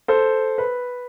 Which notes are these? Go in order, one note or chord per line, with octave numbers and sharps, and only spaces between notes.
A4 C5
B4